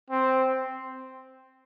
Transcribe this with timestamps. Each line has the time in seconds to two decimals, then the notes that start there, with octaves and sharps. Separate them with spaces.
0.10 C4